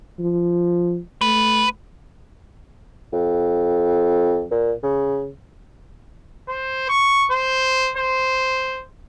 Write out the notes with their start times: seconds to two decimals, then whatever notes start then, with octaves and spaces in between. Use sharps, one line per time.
0.19 F3
1.21 A3 B4
3.13 F2
4.51 A#2
4.83 C#3
6.49 C5
6.89 C#6
7.31 C5
7.97 C5